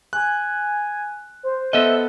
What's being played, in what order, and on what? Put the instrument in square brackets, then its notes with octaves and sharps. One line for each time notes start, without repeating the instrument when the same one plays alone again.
[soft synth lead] G#5 [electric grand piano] F#6
[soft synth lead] C5
[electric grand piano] B3 A4 F#6 [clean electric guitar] D#5 E5